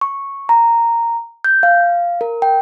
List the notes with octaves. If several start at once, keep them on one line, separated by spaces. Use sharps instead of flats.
C#6
A#5
G6
F5
A#4
G5